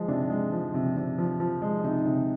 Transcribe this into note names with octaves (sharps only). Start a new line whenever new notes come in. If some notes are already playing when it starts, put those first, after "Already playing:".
Already playing: F3 G#3
C3 D4
G#3
F3
C3
C3
F3
F3
G#3
C3 D#4
C3